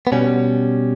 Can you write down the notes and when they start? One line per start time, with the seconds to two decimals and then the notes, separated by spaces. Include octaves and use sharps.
0.07 B3
0.12 B2 G3 C#4